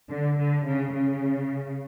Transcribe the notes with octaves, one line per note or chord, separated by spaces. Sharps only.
D3
D3
C#3
C#3